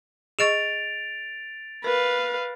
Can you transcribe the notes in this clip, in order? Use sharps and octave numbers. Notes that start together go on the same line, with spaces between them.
G#4 D#5 C#6 A6 D7 F7
A#4 B4 F5